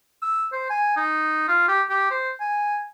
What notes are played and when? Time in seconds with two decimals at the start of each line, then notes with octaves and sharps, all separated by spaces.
0.22 E6
0.52 C5
0.70 G#5
0.97 D#4
1.48 F4
1.68 G4
1.90 G4
2.11 C5
2.40 G#5